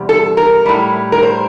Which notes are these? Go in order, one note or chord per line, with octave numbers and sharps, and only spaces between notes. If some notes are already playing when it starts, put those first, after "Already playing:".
Already playing: E2 C3 G3
A4
A#4
A2 G3
A#4
C5